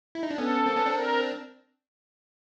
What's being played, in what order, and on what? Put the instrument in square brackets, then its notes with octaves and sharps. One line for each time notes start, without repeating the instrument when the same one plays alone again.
[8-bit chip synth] E4
D#4
D4
[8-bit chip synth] B3 C#4 [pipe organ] A4
[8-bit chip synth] A#3 C4
B3 C#4
C4 D4
[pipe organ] A#4